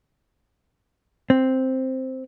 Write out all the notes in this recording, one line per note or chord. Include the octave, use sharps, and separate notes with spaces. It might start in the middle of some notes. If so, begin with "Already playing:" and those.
C4